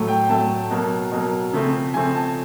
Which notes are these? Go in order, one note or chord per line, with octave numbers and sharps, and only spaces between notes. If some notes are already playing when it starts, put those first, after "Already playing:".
Already playing: A2 F#3 A3
G5
A2 F#3 A3 A5
B2 F#3 A#3
B2 F#3 A#3
C#3 F3 A3 C4
C#3 F3 A3 C4 G#5
A5